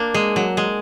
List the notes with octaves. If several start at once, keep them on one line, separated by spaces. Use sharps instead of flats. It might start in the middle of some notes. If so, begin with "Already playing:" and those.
Already playing: A#3 D4
G#3
F#3
G#3